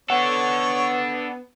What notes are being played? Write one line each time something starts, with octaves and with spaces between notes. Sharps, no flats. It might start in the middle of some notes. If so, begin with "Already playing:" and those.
B3 D4 A4 C#5 F#5